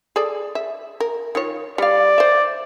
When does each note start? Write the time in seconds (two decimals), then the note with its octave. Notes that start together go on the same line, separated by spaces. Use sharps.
0.16 G#4 A4 D5
0.55 E5
1.00 A#4
1.35 D#3 F4 C#5
1.78 G3 D5 F5
2.18 C5 E5